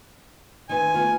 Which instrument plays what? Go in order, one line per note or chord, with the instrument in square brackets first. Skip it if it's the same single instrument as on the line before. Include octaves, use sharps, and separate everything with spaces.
[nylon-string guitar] D#3 C4 B4 [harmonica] G#5
[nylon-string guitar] A3 B3 F4